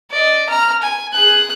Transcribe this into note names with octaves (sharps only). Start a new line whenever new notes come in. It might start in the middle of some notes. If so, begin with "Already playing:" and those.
D5 D#5
A#5 F6
G#5
G#4 F#6